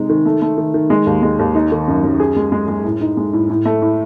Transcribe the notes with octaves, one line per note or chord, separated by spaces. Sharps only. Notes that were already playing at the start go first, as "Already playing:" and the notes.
Already playing: C3 G#3 D#4
D#3
A3
A3
D#3
D#3
G#3
D#2
G#3
D#2
D#4
D#3
F#2
F#2
G#4
G#3
G#3
G#3
A2
D#4
G#3
A2
A2
A3
A2